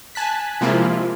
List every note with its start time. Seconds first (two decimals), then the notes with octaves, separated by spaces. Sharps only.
0.15 G#5 A5 F#6 B6
0.61 C3 F3 G#3 A#3 E4 F4